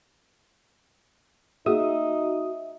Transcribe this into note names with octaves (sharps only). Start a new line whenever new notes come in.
A#3 D#4 F#4 G#4 E5 D#6